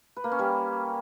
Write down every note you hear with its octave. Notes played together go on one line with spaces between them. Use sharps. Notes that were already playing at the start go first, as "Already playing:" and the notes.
B4
A#3
C#4
G3